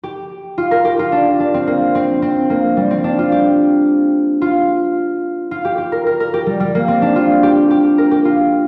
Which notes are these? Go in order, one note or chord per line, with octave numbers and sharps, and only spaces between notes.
G4
F4
A#4
G4
F4
D4
D4
C4
A#3
C4
C4
A#3
G3
C4
D4
F4
G4
F4
F4
G4
G4
A#4
A#4
A#4
G4
G3
G3
A#3
C4
D4
F4
G4
G4
A#4
G4
F4